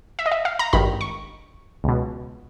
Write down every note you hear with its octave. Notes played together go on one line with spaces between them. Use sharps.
E5
D#5
E5
F5
A#5
G#1 G2 D#3 B5
C#6
C#2 B2